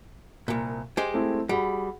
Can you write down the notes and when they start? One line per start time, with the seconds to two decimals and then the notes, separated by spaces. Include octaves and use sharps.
0.48 C2 A#2
0.97 G#3 G4 C5
1.14 A3 C4 E4
1.49 G3 F#4 G#4 B5